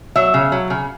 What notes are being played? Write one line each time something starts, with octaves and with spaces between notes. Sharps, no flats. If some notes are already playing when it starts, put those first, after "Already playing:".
F#3 E5
C#3
F#3
C#3